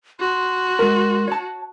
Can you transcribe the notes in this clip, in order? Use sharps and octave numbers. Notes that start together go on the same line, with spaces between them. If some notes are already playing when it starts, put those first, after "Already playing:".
F#4 C6
G#3 A#4
C#5 A5